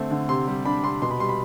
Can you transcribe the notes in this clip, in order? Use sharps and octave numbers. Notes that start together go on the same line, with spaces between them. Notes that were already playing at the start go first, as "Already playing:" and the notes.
Already playing: D3 A3 C4
D3
C3 C6
G3
D4 B5
C3 C6
B2 C6
B5
G3 C6
B5